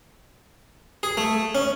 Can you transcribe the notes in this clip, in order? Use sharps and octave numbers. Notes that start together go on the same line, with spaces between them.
G#4
A3
C#4